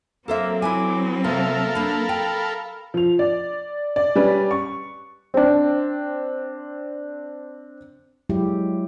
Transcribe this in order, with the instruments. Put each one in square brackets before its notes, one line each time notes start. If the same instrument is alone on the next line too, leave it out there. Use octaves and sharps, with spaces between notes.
[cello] F#3 C4 [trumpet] A#3 [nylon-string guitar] A4 C5 E5
[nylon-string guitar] E4 B4 G#5 [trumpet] D6
[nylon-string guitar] C3 A#3 [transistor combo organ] A4 A#4 F5 [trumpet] E5
[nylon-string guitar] A#3 D4 [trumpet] B5
[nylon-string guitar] G5
[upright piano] F3 F7
D5
D5
G3 C#4 B4 D5
C#6
[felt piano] C4 D4
[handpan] F#3 G#3 E4 G4